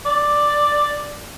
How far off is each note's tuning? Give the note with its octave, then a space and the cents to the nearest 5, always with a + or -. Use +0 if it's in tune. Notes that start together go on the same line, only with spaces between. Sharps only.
D5 +5